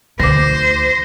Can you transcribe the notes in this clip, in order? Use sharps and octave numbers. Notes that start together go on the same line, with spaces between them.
D2 D3 D#3 C5 D6 A#6